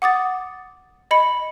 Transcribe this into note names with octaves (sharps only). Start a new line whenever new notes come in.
F#5 D6 D#6 A6
D#5 B5 C#7